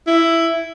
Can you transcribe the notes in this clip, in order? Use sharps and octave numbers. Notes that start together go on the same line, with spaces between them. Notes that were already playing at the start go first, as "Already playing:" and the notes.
E4